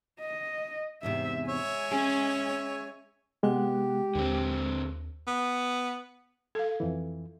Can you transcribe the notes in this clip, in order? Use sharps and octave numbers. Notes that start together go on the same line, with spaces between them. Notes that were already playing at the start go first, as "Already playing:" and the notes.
D#5
E2 G#2 C3 E5
G#3 C#5 E5 G#5
C#4 G#4
C3 G#3 B3 G4 F#5
D#2 D3 C4
B3
A4 F5 G#6
F2 E3